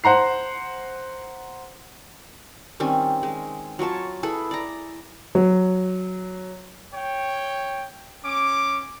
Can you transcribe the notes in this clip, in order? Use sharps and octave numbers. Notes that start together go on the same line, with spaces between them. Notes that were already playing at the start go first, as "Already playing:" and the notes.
C5 F#5 A#5 C7
D#3 G3 C4 C#4
G#3
F#3 F4 C#5 A5
E4 G#4 A4 B4
D5 A#5
F#3
C#5 G5
C#4 D6